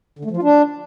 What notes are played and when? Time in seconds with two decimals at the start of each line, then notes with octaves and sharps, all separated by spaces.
0.19 D3
0.25 A3
0.31 F3
0.37 F4
0.43 D4